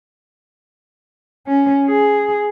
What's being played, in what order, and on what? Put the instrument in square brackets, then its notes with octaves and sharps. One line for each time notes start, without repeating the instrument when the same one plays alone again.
[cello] C#4
G#4